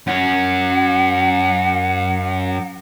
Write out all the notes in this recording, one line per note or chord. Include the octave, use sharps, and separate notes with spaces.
F#2 C#4 F#5